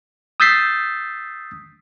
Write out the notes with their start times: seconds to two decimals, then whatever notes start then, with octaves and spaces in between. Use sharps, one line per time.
0.40 D#6 E6 G6 A6 B6 C7